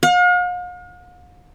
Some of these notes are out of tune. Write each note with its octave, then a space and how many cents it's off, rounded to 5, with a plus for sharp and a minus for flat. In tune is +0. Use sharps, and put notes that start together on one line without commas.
F5 +45